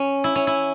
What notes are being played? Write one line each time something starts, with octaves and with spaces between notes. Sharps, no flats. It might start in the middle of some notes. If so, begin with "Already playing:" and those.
Already playing: C#4
E4
C#4
E4